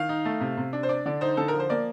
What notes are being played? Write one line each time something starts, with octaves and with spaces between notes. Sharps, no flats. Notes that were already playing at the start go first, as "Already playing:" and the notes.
Already playing: D#3 F5
D#4
A3
C3
C3
D4
C5
D4 D5
D3 D5
D#4 C5
D3 A4
A#4
F3
C5
A#3 D5